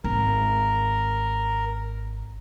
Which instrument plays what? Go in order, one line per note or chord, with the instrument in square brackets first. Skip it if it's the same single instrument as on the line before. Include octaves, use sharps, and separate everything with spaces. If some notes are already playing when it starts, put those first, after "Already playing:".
[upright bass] G#1 [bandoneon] A#4